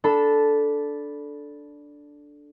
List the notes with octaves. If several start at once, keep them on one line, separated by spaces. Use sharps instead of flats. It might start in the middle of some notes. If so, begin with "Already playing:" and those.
D4 A4 A5 B5